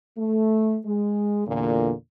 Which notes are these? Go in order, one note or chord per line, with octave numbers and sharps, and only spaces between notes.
A3
G#3
E2 A#2 D3